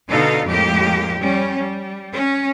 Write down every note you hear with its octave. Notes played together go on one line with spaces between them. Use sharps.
B2 D3 D#4 A4 F5
F2 A2 G#3 A#3 G4
G3 C#4
G3
C#4